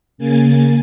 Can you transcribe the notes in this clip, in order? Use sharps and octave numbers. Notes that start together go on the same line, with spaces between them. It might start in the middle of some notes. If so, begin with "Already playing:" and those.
C#3 A#3 G#5 A6